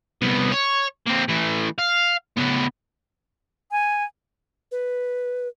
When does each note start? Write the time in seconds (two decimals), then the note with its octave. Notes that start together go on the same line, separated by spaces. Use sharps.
0.22 C2 B3
0.52 C#5
1.06 A#3 C4
1.28 E3 A3
1.78 F5
2.38 C#3 B3
3.71 G#5
4.72 B4